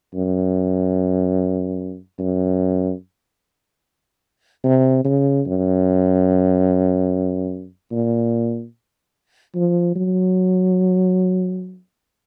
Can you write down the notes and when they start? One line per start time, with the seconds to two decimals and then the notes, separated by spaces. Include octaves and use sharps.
0.14 F#2
2.19 F#2
4.64 C3
5.04 C#3
5.46 F#2
7.91 A#2
9.55 F3
9.95 F#3